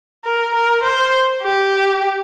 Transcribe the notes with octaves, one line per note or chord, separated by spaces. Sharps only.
A#4
A#4
C5
G4